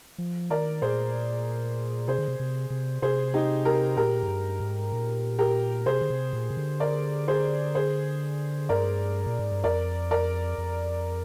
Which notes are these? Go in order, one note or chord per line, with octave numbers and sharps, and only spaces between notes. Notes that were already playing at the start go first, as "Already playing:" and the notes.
F3
D#3 A#4 D5
A#2 G#4 C5
C3 G#4 C5
D3
C3
C3
C3
C3 G#4 C5
D#4 G4
G4 A#4
A#2 G4 A#4
G#2
G2
G#2
A#2
G4 A#4
C3 G#4 C5
D3
C3
A#2
C3
D3
A#4 D5
G#4 C5
G#4 C5
G2 A#4 D5
A#2
G#2
G2
F2 A#4 D5
A#4 D5
F2